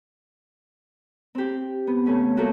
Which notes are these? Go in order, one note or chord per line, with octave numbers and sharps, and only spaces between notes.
C4 G4
B3
C#3 A3 C#4
A3 A#3 F4 F#4